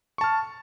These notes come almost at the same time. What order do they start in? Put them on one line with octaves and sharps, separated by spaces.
C#6 A5 F6